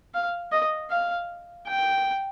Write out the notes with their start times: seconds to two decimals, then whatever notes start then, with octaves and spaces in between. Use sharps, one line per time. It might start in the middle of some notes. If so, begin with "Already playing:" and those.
0.14 F5
0.52 D#5
0.90 F5
1.67 G5